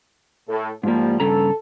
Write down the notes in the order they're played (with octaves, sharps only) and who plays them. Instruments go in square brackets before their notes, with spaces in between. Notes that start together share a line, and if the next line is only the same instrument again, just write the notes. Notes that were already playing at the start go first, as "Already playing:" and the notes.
[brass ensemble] A2 A4
[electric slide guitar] G#2 A#3 [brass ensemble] F3 G3
[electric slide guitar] G2 C#3 A#5 [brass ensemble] A4